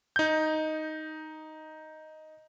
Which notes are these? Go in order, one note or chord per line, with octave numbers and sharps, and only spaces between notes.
D#4 G6